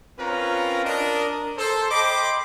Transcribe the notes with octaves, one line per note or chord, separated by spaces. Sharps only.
C4 C#4 F4 A#4 B4 A#5
D4 A#4 D#5
A4 C5
D#5 G5 B5 C6 D6